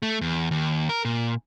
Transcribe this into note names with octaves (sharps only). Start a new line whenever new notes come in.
A3
E2
D#2
A#4
A#2